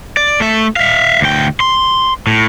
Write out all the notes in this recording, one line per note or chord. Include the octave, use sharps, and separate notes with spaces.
D5
A3 E5
E5 F5
D2 G5
C6
A2